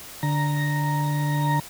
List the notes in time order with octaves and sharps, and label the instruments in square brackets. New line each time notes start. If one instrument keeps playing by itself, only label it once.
[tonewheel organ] D3 A#5